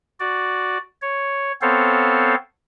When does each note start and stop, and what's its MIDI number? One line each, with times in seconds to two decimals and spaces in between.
0.20 0.78 66
0.20 0.78 74
1.02 1.52 73
1.62 2.35 59
1.62 2.35 60
1.62 2.35 69
1.62 2.35 72
1.62 2.35 73
1.62 2.35 77